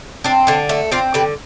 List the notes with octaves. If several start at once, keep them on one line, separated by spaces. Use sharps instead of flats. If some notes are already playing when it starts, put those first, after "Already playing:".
C4 D4
D3 D4
A3 D4
C4 D4 F4
D3 G4 B4